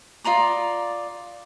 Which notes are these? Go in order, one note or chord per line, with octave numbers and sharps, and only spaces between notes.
F4 D5 A#5 D#6